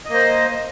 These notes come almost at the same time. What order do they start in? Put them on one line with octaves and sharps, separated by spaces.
D#5 A#3 C5